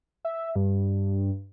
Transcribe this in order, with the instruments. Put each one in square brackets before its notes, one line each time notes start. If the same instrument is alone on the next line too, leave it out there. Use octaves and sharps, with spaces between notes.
[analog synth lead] E5
G2